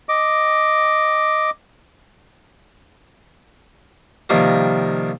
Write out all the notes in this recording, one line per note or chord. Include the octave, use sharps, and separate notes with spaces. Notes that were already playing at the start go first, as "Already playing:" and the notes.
D#5 D6
C3 D#3 F3 G3 A#3